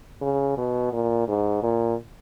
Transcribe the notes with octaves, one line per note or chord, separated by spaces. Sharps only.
C#3
B2
A#2
G#2
A#2